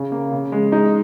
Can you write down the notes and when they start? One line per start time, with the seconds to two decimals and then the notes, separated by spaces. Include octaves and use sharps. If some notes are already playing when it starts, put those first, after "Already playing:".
Already playing: C#3
0.12 A#3
0.32 C#3
0.52 G#3
0.72 G#3 D#4